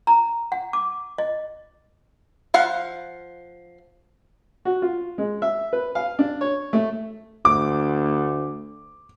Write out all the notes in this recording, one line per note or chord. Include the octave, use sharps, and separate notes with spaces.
A#5
F#5
D6
D#5
F3 F5 F#5
F#4
F4
G#3
E5
B4
F5
D4
C#5
A3
D2 D6